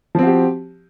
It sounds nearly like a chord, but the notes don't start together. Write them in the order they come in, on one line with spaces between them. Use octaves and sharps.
F3 C4 F#4 G4